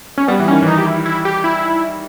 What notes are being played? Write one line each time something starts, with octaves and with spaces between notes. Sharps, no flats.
C#4
G3 B3
E3
D#3 C#4
E3 D#4
G4
E4
E4
G4
E4